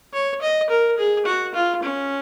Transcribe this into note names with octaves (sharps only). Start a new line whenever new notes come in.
C#5
D#5
A#4
G#4
F#4
F4
C#4